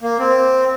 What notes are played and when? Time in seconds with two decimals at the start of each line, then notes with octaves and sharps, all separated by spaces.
0.02 A#3
0.19 C4